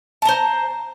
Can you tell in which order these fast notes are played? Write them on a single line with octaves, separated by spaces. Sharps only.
A5 A#5 C5